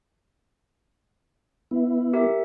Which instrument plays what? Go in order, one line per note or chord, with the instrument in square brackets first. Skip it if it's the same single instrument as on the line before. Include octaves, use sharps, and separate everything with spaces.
[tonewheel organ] B3 E4
[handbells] G4 A#4 E5